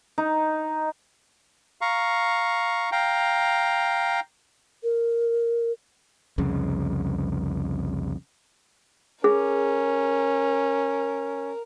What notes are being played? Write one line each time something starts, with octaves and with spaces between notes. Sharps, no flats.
D#4
F5 A#5 C#6
F5 G5 A#5
A#4
C2 F2 C#3
C#4 G#4 A#4